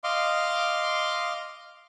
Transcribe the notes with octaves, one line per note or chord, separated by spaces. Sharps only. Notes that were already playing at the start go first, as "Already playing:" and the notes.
D#5 F5 C6 D6